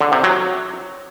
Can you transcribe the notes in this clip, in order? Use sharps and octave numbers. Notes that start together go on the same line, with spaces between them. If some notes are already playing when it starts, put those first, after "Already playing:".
D3
C3
F#3